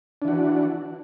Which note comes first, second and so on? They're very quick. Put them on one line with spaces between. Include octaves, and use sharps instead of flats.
D4 E3 F#4